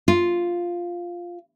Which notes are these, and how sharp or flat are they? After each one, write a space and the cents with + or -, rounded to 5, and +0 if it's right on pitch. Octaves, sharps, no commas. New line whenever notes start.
F4 +0